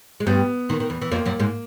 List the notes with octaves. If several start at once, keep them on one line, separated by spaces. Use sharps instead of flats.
G#3
G2 G3 B3
D#2 D#3
D#3
E2 E3
E3
F2 F3 A#3
F#2 F#3
G#2 G#3